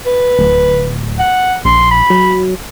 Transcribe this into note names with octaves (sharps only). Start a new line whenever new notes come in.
B4
D1
F#5
A#1 C6
B5
F#3